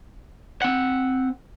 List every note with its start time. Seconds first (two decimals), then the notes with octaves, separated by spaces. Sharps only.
0.62 C4 F#5